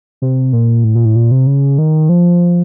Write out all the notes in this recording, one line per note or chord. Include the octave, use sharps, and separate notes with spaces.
C3
A#2
A2
A#2
A2
A#2
C3
C#3
D#3
F3